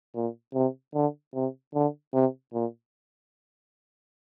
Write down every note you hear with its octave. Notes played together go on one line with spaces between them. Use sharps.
A#2
C3
D3
C3
D3
C3
A#2